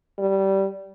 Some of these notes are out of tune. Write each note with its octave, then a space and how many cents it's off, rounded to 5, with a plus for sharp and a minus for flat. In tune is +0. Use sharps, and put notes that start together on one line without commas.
G3 -15